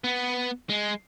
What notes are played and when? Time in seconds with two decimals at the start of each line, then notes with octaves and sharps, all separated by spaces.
0.04 B3
0.69 G#3